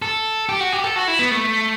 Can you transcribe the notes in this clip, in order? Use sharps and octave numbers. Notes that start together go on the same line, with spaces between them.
A4
G4
F#4
G4
A4
F#4
E4
B3
A3